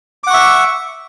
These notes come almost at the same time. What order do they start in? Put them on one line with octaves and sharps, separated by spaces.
D6 F#5 C#6 E5